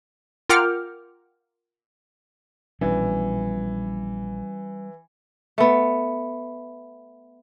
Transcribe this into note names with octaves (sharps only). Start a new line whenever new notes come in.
F4 A#4 F#5 G5 D6 F6
A#1 B2 E3 G3 C#4 D4
A3 B3